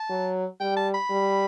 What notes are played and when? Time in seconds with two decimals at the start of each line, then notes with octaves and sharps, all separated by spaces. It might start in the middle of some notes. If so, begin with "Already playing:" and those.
Already playing: A5
0.10 F#3
0.60 G3 G5
0.76 A5
0.94 B5
1.11 G3